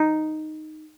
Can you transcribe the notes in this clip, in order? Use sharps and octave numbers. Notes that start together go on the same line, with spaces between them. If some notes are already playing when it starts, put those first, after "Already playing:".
Already playing: D#4